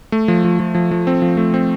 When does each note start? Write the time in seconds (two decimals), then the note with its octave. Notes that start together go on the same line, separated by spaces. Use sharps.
0.12 A3
0.28 F3
0.44 F3
0.60 F3
0.75 F3
0.91 F3
1.07 C4
1.22 F3
1.37 A3
1.54 C4